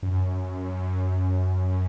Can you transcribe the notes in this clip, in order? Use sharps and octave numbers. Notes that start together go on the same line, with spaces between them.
F#2